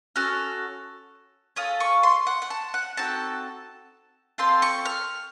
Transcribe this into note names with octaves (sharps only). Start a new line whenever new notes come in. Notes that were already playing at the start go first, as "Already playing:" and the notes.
C#4 F#4 A4 F6
C#4 F4 A4 D#6
C#6
C6
F#5
F#5
A5
F#5
C4 D#4 F#4 A4 A5
C4 F4 A4 C6
C#6
F6